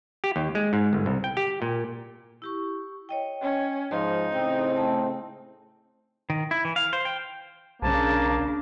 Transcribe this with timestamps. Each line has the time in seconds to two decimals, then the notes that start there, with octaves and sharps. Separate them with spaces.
0.24 G4
0.36 D#2
0.55 G#3
0.73 G#2
0.93 G1
1.06 C2
1.24 G5
1.37 G4
1.62 A#2
2.42 E4 G4 C#6
3.09 C#5 D#5 G5
3.42 C#4
3.91 G#2 F3 D#4 C6
4.32 A2 C#3 C4 G5
4.76 A3 A5
6.30 D#3
6.51 E4
6.65 E3
6.76 F5
6.93 C5
7.05 G5
7.82 B1 C#3 A#3 D4 A5